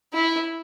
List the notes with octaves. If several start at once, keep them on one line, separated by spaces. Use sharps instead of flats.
E4